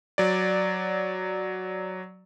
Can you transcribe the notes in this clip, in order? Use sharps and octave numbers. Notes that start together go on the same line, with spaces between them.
F#3 D5